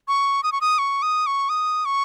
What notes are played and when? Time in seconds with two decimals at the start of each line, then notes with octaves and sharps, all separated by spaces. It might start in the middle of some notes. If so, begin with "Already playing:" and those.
0.08 C#6
0.43 D#6
0.52 C#6
0.61 D#6
0.79 C#6
1.02 D#6
1.27 C#6
1.49 D#6
1.85 C#6